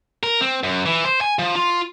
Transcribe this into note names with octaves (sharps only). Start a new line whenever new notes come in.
A#4
C4
F#2
E3
C5
G#5
F3
F4